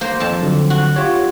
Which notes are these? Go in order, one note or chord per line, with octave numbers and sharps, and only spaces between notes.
A#3 C5
F2 A5
D3 F#3
F#4
F4 G4 C#5